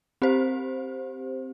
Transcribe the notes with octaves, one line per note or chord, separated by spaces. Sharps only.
C4 G4 C5